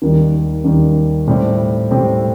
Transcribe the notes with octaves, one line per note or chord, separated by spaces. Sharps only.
D#2 D#3 G3
D#2 D#3 G3
A2 G3 C4 G4
A2 G3 C4 G4